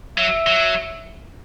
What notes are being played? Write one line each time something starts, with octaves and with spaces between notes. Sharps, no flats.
F#3 E5
F#3